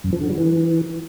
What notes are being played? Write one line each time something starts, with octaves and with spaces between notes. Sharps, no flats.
F#2
F3
D3
G3
E3